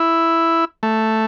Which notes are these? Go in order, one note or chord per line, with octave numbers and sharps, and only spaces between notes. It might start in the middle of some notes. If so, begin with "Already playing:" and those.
Already playing: E4
A3